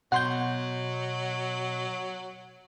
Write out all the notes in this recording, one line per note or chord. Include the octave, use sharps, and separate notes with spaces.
B2 F#3 F#5 C6 G6